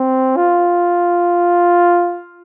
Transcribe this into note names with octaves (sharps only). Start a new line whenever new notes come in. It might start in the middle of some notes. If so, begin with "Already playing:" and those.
Already playing: C4
F4